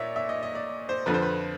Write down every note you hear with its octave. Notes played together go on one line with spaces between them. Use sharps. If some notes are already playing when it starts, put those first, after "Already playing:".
Already playing: A#2 C#5 D5 E5
E5
D#5
D#5
D5
C5
F2 D3 F3 B4
C5
B4